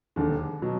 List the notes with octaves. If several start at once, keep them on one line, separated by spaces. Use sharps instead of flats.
E1 D#2 D3
B2 F#3